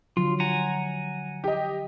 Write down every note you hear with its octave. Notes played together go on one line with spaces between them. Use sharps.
D3 F3 F#3 F4
F#5 G#5 A#5
G4 D#5